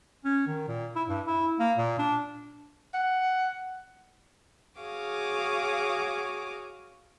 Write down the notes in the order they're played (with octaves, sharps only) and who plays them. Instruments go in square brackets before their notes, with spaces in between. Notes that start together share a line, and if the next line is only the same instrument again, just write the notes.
[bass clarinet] C#4
D#3
A#2
E4
G2
E4
A#3
A#2
D4
[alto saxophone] F#5
[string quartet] F#4 G#4 C#5 F5 D6 D#6